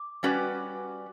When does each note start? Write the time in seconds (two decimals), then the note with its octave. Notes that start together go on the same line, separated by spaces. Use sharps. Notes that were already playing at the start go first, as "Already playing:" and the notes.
Already playing: D6
0.23 G3 C#4 F#4 B4 D5